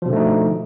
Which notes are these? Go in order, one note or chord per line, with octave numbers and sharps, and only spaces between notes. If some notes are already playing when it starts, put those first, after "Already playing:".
B2 D3 F3 A3 D#4